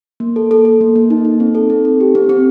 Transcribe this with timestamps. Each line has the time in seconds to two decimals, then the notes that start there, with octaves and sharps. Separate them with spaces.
0.20 A#3
0.36 A4
0.51 A4
0.65 A4
0.81 A#3
0.96 A#3
1.10 D#4
1.25 D#4
1.40 C4
1.55 A4
1.70 C4
1.85 A4
2.00 G4
2.15 C4
2.29 C4